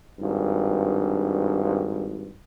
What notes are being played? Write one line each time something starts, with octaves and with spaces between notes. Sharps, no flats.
G#1 G2